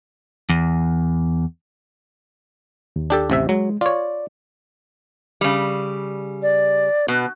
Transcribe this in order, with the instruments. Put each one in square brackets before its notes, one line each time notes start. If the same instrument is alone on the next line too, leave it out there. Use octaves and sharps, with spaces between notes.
[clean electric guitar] E2
[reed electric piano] D#2
[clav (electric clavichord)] D4 G4 A4
A1 C3 E5
[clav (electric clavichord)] F#3 [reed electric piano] G#3
[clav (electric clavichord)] F4 C#5 [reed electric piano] D5
[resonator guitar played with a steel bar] C#3 G3
[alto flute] D5
[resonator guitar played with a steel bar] B2 [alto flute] B3